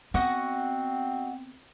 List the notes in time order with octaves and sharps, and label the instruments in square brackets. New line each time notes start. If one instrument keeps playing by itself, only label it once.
[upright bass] B3 [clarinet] C4 [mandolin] F#4 D#5 F#5